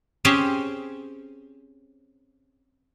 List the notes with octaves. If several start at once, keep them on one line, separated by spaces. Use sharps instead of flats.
C4 C#4 G4 G#4 C5 C#5